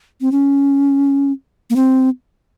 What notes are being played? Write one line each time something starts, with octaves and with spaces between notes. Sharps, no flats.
C4
C#4
A#3
C4